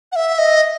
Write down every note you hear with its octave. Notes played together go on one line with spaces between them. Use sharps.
F#5
E5
D#5